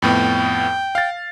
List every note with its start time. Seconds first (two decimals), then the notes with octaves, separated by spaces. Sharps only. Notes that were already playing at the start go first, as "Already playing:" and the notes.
0.02 F2 A2 B3 G5
0.95 F5 A6